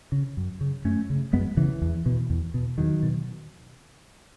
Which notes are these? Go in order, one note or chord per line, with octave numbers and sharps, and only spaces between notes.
C#3
F#2
C#3
F#2 A3 C#4
C#3
F#2 G#3 B3
C#3 E3
E2
B2
E2
B2
E2 D#3 F#3
B2